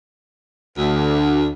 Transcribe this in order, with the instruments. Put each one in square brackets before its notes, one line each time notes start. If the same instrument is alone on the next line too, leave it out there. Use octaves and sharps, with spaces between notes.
[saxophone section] D2